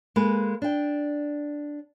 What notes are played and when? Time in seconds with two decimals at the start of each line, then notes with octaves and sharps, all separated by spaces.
0.16 G#3 A#3 A4 B4
0.62 D4 G5